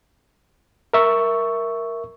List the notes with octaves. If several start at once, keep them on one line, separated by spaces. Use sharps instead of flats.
A#4 E5 C#6